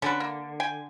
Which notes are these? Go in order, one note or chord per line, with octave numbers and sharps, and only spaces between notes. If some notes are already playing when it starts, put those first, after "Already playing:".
D3 C#4 F#4 B4
A#3
G5 G#5